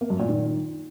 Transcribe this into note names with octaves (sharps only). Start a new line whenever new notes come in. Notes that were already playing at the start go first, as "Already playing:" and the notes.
A#3
F#2
A#2
D#3